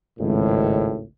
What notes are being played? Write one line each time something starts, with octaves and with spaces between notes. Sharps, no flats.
G#1 C#2 A2